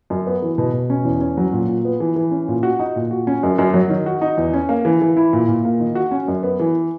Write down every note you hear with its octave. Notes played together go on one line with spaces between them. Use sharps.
F#2
B3
E3
B2
B2
C#4
E2
C#4
F#3
A#2
A#2
B3
E3
E3
C#4
A#2
F#4
D#4
A#2
F#4
C#4
F#2
F#2
F#3
D#3
F#4
D#4
E2
C#4
A#3
E3
E3
E4
A#2
A#2
A#3
D#3
F#4
C#4
F#2
B3
E3